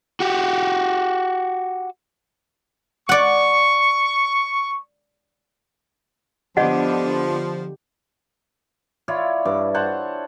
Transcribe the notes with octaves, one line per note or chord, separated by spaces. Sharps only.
F#4 G4
D5 F#5 C#6
D3 F3 B3 D4 G4 D#5 F#5
E4 F4 C#5 D5
G2 D6
C5 C#5 F#5 A5